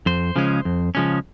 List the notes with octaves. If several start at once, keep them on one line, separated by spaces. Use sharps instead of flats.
F2 C5
C#3 F3 G#3 C#4
F2
C#3 F3 G#3 C#4